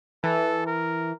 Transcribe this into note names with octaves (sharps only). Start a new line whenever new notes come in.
E3 A4
A#4